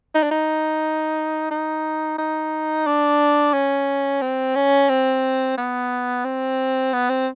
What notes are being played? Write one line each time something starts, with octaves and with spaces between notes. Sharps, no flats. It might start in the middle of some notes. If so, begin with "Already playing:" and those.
D#4
D4
D#4
D#4
D#4
D4
C#4
C4
C#4
C4
B3
C4
B3
C4